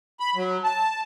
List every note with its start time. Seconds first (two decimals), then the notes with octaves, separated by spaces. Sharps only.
0.20 B5
0.35 F#3
0.64 A5